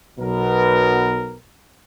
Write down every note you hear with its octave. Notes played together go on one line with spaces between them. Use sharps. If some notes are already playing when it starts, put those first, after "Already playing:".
B1 B2 F#3 B3 A#4